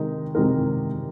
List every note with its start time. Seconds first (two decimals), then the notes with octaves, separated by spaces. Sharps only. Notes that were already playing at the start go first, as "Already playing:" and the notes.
Already playing: C3 D#3 G#3 D#4 A#4
0.35 C3 D#3 G#3 D#4 A#4